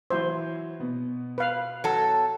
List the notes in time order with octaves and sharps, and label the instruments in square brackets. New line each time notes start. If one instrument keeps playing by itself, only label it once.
[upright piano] E3 F#3 E4 [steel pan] C5
[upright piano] B2 B3
[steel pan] B4 F5
[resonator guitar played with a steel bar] F#3 A4